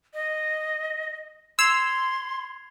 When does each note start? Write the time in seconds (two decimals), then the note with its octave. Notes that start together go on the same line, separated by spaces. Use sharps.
0.14 D#5
1.59 C6 E6 G#6 C7 F7